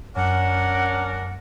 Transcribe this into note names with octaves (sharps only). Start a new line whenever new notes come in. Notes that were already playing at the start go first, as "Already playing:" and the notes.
F#2 C#4 D4 A#4 F#5